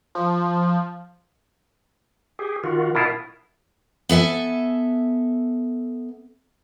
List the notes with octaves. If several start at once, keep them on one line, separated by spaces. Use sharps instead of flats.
F3
G4 G#4
D#3 F4 F#4
B2 E4 F4 A#4
B3 A4 E5 G#5